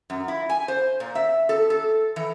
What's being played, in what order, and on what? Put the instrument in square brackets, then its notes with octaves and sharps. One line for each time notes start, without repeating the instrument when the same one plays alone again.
[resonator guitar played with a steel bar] F#2
E4
G#5
C5
A#2
E5
A4
A4
E3